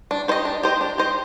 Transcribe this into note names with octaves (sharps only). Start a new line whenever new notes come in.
D4
G4 C5 D#5
D4
G4 C5 D#5
D4
G4 C5 D#5